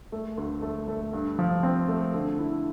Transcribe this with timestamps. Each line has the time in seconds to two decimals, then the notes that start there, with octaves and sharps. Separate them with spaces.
0.12 A3
0.37 D2
0.62 A3
0.88 A3
1.13 G2
1.39 F3
1.63 C4
1.88 A3
2.14 D3
2.39 E4